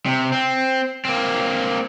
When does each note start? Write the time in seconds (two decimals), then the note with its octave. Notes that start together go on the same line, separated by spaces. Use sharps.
0.06 C3
0.32 C4
1.05 A#3 C4